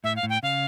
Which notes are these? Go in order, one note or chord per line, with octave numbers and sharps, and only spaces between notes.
A2 E5
F5
A2
G5
C#3 F5